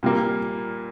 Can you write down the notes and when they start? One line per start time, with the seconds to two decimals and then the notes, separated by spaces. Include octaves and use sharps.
0.03 A#2 G3 A#3